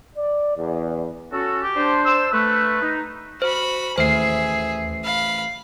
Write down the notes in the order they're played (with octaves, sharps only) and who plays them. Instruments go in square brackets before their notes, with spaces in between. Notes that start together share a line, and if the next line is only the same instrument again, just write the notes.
[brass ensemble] D5
E2
[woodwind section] C#4 F#4 A4
[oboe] G4
[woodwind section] D4 C5
[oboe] E6
[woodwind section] A3 [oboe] B4
[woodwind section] D#4
[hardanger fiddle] F#4 B5 [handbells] C5
[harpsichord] A1 [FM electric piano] D#2 C7 [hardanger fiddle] G#4 E5 [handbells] C5
[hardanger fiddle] F5 B5